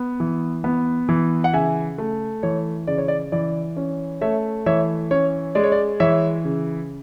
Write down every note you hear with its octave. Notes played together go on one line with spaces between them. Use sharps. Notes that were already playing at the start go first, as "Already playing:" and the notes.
Already playing: B3
E3
B3
E3
F#5
C#3 E5 G#5
A3
E3 C#5
C#3 D5
C#5
D5
E3 D5
C#4
A3 C#5 E5
E3 C#5 E5
C#4 C#5
G#3 D5
C#5
D5
E3 C#5 E5
C#3